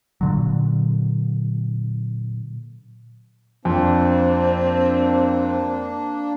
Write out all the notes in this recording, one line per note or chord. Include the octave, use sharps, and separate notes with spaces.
A#2 D3 F#3
F2 A#3 C4 D4